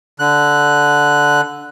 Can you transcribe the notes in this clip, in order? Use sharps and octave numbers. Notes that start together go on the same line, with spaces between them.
D3 F#6